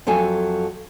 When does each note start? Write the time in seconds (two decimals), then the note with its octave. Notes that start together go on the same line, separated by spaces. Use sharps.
0.07 F2 F#3 A4 G#5